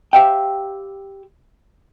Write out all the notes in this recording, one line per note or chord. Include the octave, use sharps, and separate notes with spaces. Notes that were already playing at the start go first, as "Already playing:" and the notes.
G4 C5 E5 F5 G5